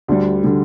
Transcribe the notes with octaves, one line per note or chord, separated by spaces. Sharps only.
D2 D3 G3 D4
D3 G3